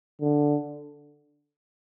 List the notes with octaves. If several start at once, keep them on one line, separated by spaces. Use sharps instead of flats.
D3